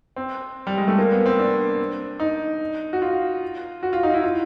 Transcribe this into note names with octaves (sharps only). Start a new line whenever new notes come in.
C4
G3
G#3
A3
A#3
B3
C4
D4
D#4
F#4
F4
F#4
F4
D#4
E4
F4